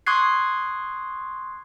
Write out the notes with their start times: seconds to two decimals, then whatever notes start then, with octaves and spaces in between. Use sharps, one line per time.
0.06 C6 C#6 D#6 F#6 G#6 C7